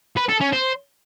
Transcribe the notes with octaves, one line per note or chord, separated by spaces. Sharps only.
B4
A4
C#4
C5